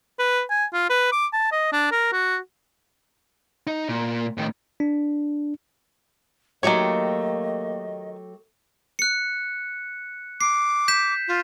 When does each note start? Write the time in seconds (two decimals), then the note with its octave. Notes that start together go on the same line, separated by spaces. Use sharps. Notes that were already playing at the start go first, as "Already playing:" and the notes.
0.19 B4
0.50 G#5
0.73 F4
0.90 B4
1.12 D6
1.33 A5
1.52 D#5
1.72 D4
1.91 A#4
2.12 F#4
3.67 D#4
3.89 A#2
4.38 A2 D#3
4.80 D4
6.63 D#3 F#3 A3 A#3 G4 C#5 D#5
8.99 F#6 C#7
10.41 D6 C7
10.88 G6 B6 E7
11.28 F4